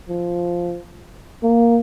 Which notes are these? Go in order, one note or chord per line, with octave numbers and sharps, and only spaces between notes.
F3
A#3